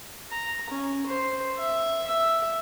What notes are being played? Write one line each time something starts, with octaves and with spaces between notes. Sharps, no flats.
A#5
C#4
C5
E5
E5